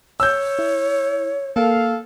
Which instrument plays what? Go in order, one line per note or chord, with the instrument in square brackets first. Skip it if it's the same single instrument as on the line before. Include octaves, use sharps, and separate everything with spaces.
[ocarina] C#5 [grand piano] E6 G6
[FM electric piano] E4
[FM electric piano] A#3 [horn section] A4 F5